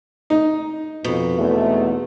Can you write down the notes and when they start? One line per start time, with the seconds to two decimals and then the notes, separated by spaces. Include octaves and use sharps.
0.30 D#4
1.04 F2 B2
1.39 E2 G#2 C3 A3